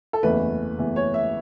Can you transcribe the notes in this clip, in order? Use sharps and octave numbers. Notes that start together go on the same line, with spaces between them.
A4
F#1 E2 E3 A3 B4
F#1 E2 E3 A3
C#5
E5